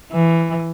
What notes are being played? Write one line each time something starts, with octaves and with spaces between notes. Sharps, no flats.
E3